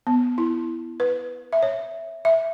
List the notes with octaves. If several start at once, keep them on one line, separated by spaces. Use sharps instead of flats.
B3
E4
B4
E5
C#5
E5